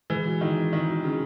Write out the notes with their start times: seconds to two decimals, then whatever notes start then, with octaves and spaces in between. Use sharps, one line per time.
0.10 E3 G#3
0.26 F#4
0.41 D#3 E3
0.57 C4
0.73 D#3 G#3
0.88 F#4
1.04 C#3 E3